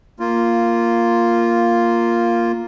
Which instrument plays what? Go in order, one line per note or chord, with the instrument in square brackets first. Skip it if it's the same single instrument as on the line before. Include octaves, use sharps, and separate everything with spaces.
[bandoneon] A#3 F4